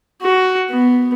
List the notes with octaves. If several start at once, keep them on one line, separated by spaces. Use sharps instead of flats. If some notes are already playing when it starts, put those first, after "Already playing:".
F#4
B3